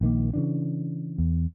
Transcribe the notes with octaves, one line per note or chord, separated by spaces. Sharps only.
A#1 D#3 A#3
C#3 E3 D4
E2